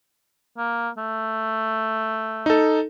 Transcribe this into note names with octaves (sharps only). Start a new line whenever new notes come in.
A#3
A3
D#4 A4